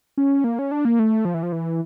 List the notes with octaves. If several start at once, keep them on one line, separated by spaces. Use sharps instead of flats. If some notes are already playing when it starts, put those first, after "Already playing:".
C#4
A#3
C#4
D4
A#3
A3
F3
E3
F3
E3